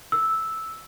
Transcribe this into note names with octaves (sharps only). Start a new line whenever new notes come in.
E6